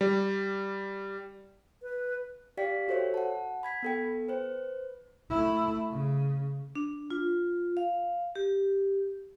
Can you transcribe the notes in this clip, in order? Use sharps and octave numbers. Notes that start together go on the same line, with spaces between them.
G3
B4
G4 D5 F5 G5 B6
F#4 A4 C5 C#5 E5
F#5 A5
B5 G#6 B6
B3 A4 G5
B4 C5
A3 E4
C#3
D4
F4
F5
G4